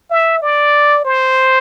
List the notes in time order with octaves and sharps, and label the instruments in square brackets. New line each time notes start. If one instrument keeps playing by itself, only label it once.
[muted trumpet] E5
D5
C5